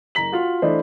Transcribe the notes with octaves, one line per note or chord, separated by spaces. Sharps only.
F#1 A#5 B6 F#7
F4 F#4
E3 A3 D4 E4 C5 D#5